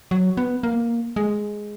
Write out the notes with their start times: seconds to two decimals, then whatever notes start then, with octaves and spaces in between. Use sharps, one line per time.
0.11 F#3
0.37 B3
0.63 A#3
1.16 G#3